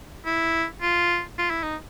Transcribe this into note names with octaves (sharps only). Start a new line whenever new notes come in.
E4
F4
F4
E4
D#4